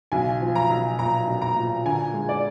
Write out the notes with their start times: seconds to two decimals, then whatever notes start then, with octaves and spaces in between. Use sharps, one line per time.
0.12 B1 G#5
0.41 F3
0.55 A#5
0.70 B1
0.99 A#2 A#5
1.27 B1
1.42 A#5
1.56 A#2
1.85 D3 G#5
2.14 G#3
2.29 D5